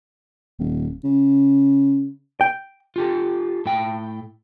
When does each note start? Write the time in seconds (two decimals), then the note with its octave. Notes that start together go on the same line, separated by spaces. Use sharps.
0.59 D#1
1.04 C#3
2.41 G5
2.96 F4 G4 A4
3.66 A2 G5